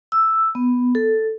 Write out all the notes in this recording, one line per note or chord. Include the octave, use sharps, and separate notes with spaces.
E6
B3
A4